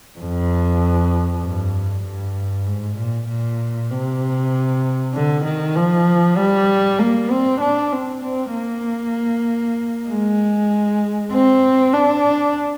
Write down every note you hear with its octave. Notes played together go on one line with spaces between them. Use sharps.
F2
G2
G2
G#2
A#2
A#2
C3
D3
D#3
F3
G3
A#3
C4
D4
C4
C4
A#3
G#3
C4
D4